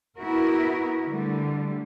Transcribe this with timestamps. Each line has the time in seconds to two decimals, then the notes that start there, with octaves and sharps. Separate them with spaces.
0.17 B3 E4 F#4 A#4
1.06 D3 G3 A3